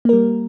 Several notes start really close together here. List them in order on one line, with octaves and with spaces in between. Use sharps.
A#3 A#4 G3